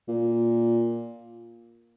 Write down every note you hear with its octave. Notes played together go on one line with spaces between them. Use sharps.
A#2